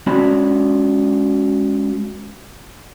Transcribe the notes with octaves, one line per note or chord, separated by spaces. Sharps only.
G#3 C#4 F#4 D5 B5